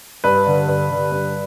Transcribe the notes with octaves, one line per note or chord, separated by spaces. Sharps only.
G2 B4
D3
G2
D3
G2